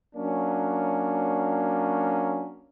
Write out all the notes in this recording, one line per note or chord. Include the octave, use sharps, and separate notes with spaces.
F#3 A#3 C#4 D4